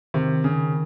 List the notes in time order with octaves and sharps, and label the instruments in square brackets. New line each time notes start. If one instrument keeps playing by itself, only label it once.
[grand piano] C3 [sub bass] D#3
[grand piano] C#3